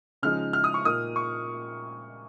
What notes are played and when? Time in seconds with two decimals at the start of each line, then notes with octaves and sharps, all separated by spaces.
0.22 C#3 F3 G#3 D#4 F6
0.53 F6
0.64 D#6
0.74 C#6
0.85 A#2 A#3 D#4 D#6
1.16 C#6